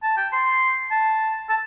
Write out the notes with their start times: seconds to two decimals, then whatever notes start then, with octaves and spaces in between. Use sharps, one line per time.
0.03 A5
0.17 G5
0.33 C6
0.91 A5
1.49 A5